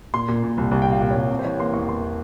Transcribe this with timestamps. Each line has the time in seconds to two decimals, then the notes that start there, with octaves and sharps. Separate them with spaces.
0.14 A#2 C6
0.28 A#2
0.43 A#2
0.58 C2
0.71 C2
0.82 G5
0.87 A#2
0.92 F5
1.01 A#2
1.11 C#5
1.15 C2
1.30 C3
1.39 C5
1.44 E3 C#5
1.59 A#3 C6
1.74 E2 C#6
1.88 E2 C6